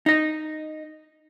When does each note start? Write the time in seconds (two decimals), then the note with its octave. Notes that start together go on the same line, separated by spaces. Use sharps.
0.06 D#4 D#5